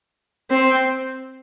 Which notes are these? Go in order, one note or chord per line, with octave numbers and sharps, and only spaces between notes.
C4